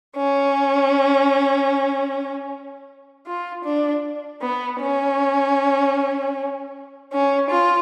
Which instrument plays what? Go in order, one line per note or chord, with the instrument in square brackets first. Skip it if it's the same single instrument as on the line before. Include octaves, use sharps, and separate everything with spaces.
[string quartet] C#4
F4
D4
B3
C#4
C#4
F4